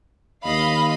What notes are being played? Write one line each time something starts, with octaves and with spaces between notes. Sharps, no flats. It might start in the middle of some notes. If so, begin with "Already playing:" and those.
D#2 D#5 F5 B5